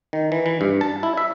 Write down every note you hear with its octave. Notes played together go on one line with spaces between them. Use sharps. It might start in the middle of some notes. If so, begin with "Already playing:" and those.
D#3
E3
E3
G2
A5
E4
E5